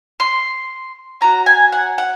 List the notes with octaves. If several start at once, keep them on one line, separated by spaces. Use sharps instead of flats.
C6
C#4 F#4 A#5
G#5
F#5
F#5